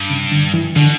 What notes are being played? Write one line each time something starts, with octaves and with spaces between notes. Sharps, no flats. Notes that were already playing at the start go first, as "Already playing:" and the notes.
Already playing: G2
C#3
D3
E3
B2 D3